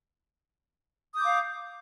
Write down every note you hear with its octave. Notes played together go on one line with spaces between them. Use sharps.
F5 D6 D#6 G6